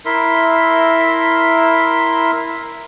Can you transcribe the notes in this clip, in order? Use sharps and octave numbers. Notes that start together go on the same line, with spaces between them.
E4 A#4 E5 C6